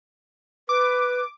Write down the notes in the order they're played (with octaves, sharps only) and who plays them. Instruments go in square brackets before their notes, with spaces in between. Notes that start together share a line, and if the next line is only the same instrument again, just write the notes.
[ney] B4 [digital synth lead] D6